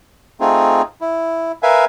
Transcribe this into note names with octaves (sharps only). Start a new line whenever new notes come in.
A3 C4 D#4 F4 G#4
E4
A#4 B4 E5 F5 G#5